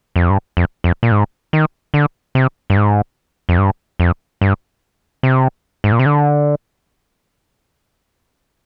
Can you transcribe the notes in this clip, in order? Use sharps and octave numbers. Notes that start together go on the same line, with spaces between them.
F2
G2
F2
F2
A#2
G#2
D#3
D3
C3
G2
G#2
F2
G2
F2
G2
C3
G#2
A#2
C3
D3